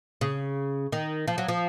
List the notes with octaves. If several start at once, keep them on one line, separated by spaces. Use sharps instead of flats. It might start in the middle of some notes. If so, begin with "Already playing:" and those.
C#3
D#3
F3
F#3
F3